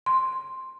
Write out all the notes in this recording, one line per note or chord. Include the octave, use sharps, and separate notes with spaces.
C6